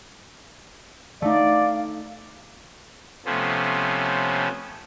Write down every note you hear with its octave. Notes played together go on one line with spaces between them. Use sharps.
A3 D#4 D5 F5
C3 F3 A3 B3 C#4